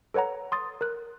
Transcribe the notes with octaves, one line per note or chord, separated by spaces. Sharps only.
A4 B4 C#5 F#5 A#5
C6 D#6 A6
A#4 F#6